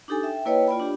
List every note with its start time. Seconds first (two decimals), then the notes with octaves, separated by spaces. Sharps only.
0.08 D4 D#4 G4 A4 G#5
0.23 E5 G5
0.45 A#3 E4 B4 C#5 D#5 G5
0.68 F4 D5 G5 B5
0.80 D4 G4